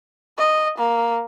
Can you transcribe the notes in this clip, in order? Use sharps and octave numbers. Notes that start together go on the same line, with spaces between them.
D#5
A#3